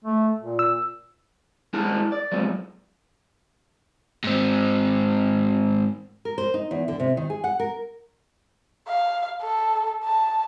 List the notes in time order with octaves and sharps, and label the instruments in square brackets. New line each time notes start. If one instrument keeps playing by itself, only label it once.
[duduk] A3
A#2
[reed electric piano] E6
[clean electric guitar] G#2 C#4 E4 G#4 A#4 A5
D5
A#2 F3 F#3 G#3 C4
[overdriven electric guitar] G#2 C4
[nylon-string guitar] A#4
C5
D#4
E2
D3
C3
D#3
G#4
F#5
A#4
[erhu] F5
A4
A5